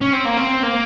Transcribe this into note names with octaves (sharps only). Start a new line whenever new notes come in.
C#4
C4
A#3
C4
A#3